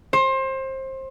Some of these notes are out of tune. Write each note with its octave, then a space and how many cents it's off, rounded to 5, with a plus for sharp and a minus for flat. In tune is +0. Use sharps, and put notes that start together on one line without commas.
C5 +25